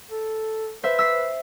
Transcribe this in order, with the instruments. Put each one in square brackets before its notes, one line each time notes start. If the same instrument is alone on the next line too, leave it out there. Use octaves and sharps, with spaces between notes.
[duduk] A4
[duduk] B4 [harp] C5 E5
[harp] E6 B6 C7